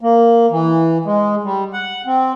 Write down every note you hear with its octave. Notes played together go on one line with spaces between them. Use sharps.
A#3
E3
G#3
G3
F#5
C4